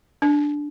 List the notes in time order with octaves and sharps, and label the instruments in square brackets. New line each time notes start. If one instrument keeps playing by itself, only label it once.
[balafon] D4